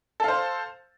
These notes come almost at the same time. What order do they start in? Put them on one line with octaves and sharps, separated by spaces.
A4 F5 C5